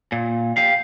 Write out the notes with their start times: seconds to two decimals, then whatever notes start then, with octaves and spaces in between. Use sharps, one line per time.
0.12 A#2
0.57 G4 F5